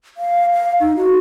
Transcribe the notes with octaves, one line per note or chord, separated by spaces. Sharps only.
F5
F5
D#4
F#4